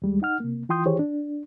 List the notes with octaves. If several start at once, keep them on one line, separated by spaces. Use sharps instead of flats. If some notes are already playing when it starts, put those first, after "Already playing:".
D#2 G3 G#3
D#4 F#5 F6
C3 A#3
E3 F4 G5 C6 D#6 G6
D#3 E3 G4 G#4 C5 C#5
D4